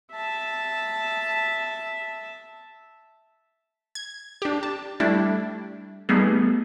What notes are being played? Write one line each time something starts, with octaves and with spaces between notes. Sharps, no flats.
E5 A5
G#6
D4 G4
A5
G3 A3 D4 E4
G3 A3 B3 D#4 G#4